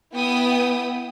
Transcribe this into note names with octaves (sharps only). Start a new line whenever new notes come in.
B3 E4 G5 D#6